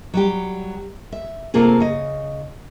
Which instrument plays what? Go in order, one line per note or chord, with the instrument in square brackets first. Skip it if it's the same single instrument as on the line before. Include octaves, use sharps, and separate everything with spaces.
[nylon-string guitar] F#3 G3 G4
E5
C3 A3 A#3 F4 G#4
C#3 D#5